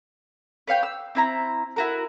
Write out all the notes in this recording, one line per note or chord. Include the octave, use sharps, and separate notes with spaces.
B4 C#5 F5 G5
E6
C4 E4 A#5
E4 F#4 A#4